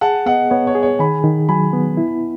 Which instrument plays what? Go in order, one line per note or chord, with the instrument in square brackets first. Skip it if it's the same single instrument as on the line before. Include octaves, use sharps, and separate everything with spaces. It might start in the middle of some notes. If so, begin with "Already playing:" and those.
[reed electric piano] G#4 [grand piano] F#5 A5
[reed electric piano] B3 [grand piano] D#5 F#5
[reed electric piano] B3 [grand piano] C#5
[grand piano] C#5
[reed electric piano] G#4
[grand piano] C#5
[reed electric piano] D#3 [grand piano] G#5 B5
[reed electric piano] D#3
[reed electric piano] F#3 [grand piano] G#5 B5
[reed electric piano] B3
E4